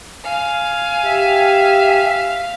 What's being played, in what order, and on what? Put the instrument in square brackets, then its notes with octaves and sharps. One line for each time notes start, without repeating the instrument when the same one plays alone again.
[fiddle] F5 [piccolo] G#5
[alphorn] G4 [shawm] E5